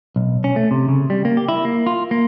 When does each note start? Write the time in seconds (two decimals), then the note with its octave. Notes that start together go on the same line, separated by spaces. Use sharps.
0.16 B1
0.44 C#4
0.56 A3
0.71 C3
0.88 C#3
1.10 G3
1.25 A#3
1.37 G4
1.49 E4
1.65 A#3
1.87 F4
2.11 A#3